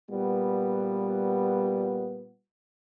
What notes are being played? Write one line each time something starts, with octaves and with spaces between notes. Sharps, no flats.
A#2 G3 B3